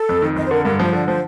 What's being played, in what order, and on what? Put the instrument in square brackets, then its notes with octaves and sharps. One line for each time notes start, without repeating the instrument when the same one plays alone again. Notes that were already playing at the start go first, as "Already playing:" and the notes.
Already playing: [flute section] A4
[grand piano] F2
D#3
[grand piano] F2 [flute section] D#5
[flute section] C5
[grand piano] D3 [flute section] A#4
[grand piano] G2 [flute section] A#4
[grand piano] F3 [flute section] C5
[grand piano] D3 [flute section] D5
[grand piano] F3 [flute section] C5